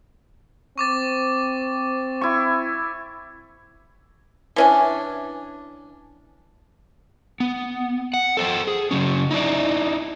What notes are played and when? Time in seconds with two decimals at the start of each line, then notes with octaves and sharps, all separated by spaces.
0.78 C4 C#6 D6 A6
2.21 E4 C#6
4.56 E3 C#4 D4
7.40 B3
8.14 F#5
8.37 A4 C5 G5
8.67 G#4
8.91 C#3 F#3 C#4
9.31 D#4 E4 D5